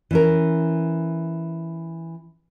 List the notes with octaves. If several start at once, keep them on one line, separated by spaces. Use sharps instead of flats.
E3 C#4 A#4